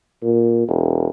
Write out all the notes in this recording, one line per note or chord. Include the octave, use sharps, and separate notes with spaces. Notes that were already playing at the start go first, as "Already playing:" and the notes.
A#2
E1